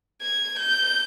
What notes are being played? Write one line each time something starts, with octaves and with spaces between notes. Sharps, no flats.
G#6
G6